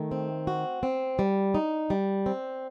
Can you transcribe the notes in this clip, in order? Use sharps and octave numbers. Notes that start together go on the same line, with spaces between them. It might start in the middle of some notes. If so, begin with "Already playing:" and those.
Already playing: D#3 A3
C4
F#4
C4
G3
D#4
G3
C4